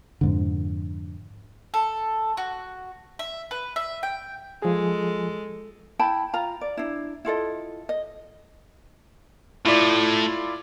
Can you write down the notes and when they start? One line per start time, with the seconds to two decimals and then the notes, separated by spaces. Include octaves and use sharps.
0.21 F2 G#2 D3
1.74 A4
2.37 F#4
3.19 E5
3.51 B4
3.76 E5
4.03 G5
4.62 F3 G#3 G#4 A4
5.99 E4 G5 A5 B5
6.34 F4 A#5
6.61 D5
6.77 D4 E4
7.25 E4 F4 A4 D#5
7.89 D#5
9.66 A2 E4 F4 D5